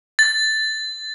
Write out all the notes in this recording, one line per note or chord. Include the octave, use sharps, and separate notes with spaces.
A6